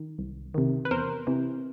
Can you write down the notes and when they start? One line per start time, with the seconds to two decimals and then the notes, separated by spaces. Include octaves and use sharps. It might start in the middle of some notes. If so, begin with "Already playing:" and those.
Already playing: D#3
0.19 C2
0.54 C3 D#3
0.85 B4
0.91 E2 A#4 C5
1.27 C3 E3